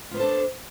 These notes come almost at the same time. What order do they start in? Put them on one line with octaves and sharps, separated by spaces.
F4 B3 C5 A4 D4